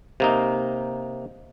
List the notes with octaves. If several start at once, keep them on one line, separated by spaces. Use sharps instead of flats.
C3 A#3 D#4